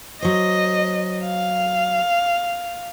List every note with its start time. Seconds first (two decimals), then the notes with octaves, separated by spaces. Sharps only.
0.22 F#3 C5 D#5
1.26 F5